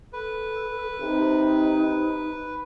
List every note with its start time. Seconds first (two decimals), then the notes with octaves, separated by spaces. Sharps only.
0.13 A4 B4
1.01 C3 D#4